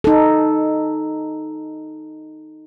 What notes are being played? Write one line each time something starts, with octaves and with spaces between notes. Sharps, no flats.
D#4 A4